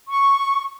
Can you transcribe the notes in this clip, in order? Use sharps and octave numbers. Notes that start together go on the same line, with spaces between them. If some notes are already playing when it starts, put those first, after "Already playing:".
C#6